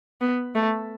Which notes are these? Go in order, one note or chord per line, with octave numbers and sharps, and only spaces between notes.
B3
A3